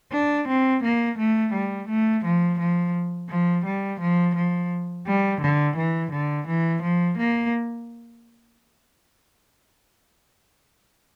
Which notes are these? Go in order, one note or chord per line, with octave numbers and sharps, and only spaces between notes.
D4
C4
A#3
A3
G3
A3
F3
F3
F3
G3
F3
F3
G3
D3
E3
D3
E3
F3
A#3